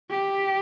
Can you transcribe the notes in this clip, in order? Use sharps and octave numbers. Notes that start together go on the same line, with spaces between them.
G4